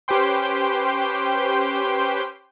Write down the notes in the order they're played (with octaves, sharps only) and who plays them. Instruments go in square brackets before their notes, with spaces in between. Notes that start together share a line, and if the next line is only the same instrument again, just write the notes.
[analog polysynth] C#4 G4 B4 C5 G5 C6